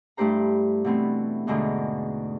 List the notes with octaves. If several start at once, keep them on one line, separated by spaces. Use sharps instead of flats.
G2 A3 E4 G4 C5 A#5
B2 E3 A3 B3 C4
E2 G#2 B2 D3 A3 D#4